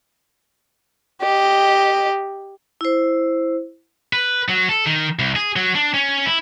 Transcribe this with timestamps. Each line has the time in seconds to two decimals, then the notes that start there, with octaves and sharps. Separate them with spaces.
1.21 G4 D#5
2.81 E4 C5
4.13 B4
4.49 F#3
4.69 A4
4.86 D#3
5.19 C2
5.36 G#4
5.56 F#3
5.75 D4
5.94 C#4
6.26 E4